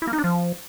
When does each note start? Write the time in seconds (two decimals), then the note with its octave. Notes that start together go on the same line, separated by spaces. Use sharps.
0.02 E4
0.07 A#3
0.13 D#4
0.18 D4
0.24 F3